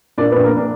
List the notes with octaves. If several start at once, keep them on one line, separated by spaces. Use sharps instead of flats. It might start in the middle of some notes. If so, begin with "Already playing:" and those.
A#2 D4 D5
B3 B4
A#1
A#3 A#4
D4